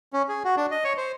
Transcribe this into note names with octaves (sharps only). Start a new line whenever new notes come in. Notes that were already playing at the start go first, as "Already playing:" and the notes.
C#4
G#4
F#4
D4
D#5
C#5
C5